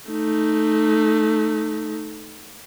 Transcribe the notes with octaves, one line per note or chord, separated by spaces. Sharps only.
A3 D#4